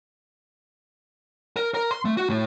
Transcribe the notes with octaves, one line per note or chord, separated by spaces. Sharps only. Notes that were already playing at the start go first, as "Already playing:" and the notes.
A#4
A#4
C6
A3
F#4
A2